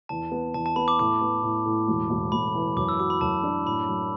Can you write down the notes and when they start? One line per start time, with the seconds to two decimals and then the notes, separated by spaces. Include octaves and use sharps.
0.09 E2 A5
0.32 B3
0.54 E2 A5
0.66 A5
0.76 B3 B5
0.88 D6
0.99 A2 D6
1.21 B3
1.43 A2
1.66 A2
1.88 E1
2.10 E1
2.32 E1 B5
2.55 E3
2.76 F#2 D6
2.89 E6
2.99 F#4 D6
3.10 B5
3.21 F#2 A5
3.44 D4
3.66 A2 B5
3.88 F#3